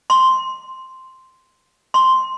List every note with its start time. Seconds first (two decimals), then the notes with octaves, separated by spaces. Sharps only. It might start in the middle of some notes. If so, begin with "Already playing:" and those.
0.10 C6
1.94 C6